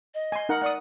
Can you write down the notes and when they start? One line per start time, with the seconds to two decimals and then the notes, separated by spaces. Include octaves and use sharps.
0.14 D#5
0.32 G#5 C6
0.49 D#4 A#4 F#5
0.62 D5 F#5 D#6